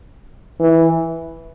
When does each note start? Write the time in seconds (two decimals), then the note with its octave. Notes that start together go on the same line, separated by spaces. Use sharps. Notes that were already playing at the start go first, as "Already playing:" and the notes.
0.60 E3